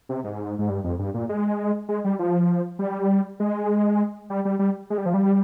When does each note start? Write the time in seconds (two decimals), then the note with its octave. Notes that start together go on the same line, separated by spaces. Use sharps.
0.09 C3
0.24 G#2
0.59 G#2
0.69 G2
0.84 F2
0.99 G2
1.14 A#2
1.29 G#3
1.89 G#3
2.04 G3
2.19 F3
2.79 G3
3.40 G#3
4.30 G3
4.45 G3
4.59 G3
4.90 G#3
4.98 G3
5.06 F3
5.14 G3